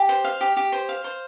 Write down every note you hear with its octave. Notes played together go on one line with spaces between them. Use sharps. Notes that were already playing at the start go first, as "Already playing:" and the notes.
Already playing: G4
C5
F5
G4
G4
C5
F5
C5